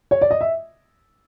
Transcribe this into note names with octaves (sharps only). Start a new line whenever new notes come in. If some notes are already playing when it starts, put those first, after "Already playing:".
C#5
D5
D#5
E5